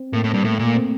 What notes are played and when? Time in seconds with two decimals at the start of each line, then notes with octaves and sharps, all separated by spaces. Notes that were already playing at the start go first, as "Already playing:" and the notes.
Already playing: C4
0.13 A2 A#3
0.24 A2
0.29 G2 C4
0.44 A2 A#3
0.55 A3
0.59 A#2
0.65 A#3
0.75 C4